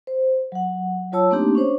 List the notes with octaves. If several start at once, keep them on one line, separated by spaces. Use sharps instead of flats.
C5
F#3 F#5
F#3 F4 C#5 A5 E6
A3 A#3 C4 D4 D#4 G4
C#4 D4 C5 C#5